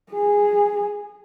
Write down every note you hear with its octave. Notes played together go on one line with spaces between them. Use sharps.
G#4